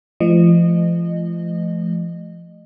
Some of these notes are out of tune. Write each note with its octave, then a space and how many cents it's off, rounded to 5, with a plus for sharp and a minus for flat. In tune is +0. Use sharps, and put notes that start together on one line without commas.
F3 -35 A3 -30 D#5 -25